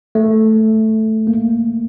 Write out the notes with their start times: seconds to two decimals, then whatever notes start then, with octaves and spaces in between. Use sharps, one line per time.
0.15 A3
1.27 A#3